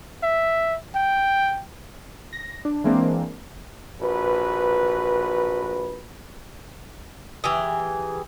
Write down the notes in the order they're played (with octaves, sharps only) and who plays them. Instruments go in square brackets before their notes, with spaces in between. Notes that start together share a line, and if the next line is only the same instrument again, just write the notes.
[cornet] E5
G5
[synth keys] A#6
D4
E3 G#3 A#3 C4 D4
[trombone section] A#1 F#4 B4
[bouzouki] E3 G4 G#4